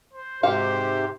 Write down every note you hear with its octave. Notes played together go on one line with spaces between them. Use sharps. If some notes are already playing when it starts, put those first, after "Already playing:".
C5
G#2 C3 F#4 G4 C5 F5